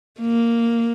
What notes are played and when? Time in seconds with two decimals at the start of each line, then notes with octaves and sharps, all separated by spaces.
0.20 A#3